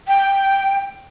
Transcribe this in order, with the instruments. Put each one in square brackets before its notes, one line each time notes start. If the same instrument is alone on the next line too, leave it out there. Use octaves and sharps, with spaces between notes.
[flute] G5